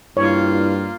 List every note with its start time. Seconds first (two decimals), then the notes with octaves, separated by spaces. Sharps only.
0.17 G2 A#3 E4 F4 C#5